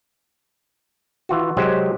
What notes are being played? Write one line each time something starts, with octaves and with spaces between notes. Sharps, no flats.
E3 F4 F#4
C3 F#3 G#3 G4 C5